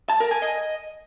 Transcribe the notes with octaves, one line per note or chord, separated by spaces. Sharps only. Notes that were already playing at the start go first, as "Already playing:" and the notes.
A5
A#4
G#5
D#5